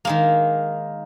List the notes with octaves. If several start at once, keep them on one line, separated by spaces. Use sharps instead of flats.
D#3 G#3 A#3